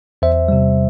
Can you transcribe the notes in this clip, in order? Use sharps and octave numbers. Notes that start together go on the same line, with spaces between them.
E2 C5 E5
C3 G3